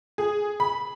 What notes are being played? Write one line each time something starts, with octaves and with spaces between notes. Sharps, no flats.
G#4
B5